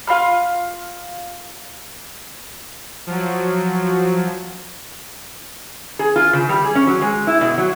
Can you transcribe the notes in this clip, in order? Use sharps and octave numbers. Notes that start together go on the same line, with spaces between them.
F4 F5 B5 F6
F3 F#3
G#4
F4
C#3
G3
G#4
C#4
F#3
G#3
E4
B2
F#3